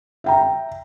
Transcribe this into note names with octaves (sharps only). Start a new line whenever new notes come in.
E5 G5 A#5